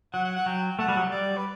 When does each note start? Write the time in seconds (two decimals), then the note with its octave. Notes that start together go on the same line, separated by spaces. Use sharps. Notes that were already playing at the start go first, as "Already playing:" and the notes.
0.13 F#3 F#5
0.25 F#5
0.36 F#5
0.46 F#3 G5
0.79 A3 F#5
0.88 G3
0.97 F#3
1.07 G3 D5
1.37 B4